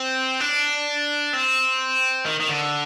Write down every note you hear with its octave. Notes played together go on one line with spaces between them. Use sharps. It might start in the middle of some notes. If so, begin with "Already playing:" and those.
Already playing: C4
D4
C4
D#3
D#3
D3